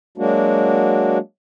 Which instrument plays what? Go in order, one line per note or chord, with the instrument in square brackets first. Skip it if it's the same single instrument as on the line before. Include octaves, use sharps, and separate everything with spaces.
[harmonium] F#3 G#3 A#3 D4 F#4